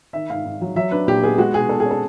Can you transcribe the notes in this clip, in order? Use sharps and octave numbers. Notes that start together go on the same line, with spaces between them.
D#3 E5
G#2 F5
G#2
F#3
F#3 E5
D4 B4
A#2 G4
B3 G#4
G#3 F#4
B2 G#4
B2 A4
G#4
C#4
A4